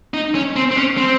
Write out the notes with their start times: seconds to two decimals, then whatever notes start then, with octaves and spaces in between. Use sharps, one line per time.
0.14 D#4
0.35 C#4
0.56 C4
0.71 C4
0.76 C#4
0.98 C4